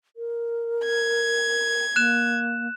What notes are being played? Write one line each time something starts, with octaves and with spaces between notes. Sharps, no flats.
A#4
G#6
A#3 F#6 E7